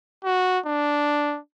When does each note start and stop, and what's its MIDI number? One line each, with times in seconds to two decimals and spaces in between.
0.25 0.59 66
0.66 1.39 62